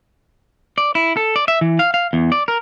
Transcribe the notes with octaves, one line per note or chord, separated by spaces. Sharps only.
D5
E4
A4
D5
E5
E3
F5
F5
E2
D5
A#4